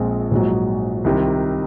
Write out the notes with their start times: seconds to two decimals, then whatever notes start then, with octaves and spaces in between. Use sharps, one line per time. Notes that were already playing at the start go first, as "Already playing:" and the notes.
Already playing: A#1 A#2 G#3 C4 F4
0.31 A#1 G#2 F#3
1.04 C2 C3 D#3